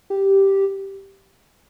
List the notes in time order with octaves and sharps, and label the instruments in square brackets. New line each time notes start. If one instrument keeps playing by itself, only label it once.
[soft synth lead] G4